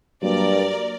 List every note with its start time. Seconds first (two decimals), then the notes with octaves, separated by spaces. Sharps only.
0.23 G2 F#3 A#3 A#4 D5